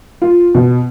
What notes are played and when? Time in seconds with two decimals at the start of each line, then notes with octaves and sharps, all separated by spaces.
0.22 F4
0.54 B2